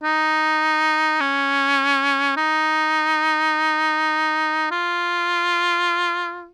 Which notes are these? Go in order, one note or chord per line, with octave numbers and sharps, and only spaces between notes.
D#4
C#4
D#4
F4